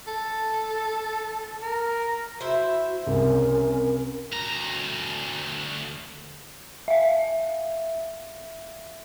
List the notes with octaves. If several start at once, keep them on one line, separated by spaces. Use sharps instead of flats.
A4
A#4
E4 F#4 C5
C2 C#3 C#4 A#4
D2 A#5
E5 F5